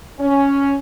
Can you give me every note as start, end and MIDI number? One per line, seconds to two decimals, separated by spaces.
0.20 0.75 61